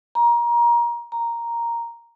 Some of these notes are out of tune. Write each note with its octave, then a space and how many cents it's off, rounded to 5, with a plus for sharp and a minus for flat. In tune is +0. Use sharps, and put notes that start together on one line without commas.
A#5 +25
A#5 +0